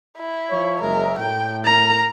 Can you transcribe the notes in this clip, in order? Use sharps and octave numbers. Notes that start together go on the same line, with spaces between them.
E4
F3 C#5
F#1 G#3 A#4 E5
A2 G5
A#4 A#5